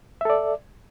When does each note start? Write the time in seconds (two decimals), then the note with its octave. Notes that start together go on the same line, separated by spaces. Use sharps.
0.21 E5
0.25 A4
0.30 D5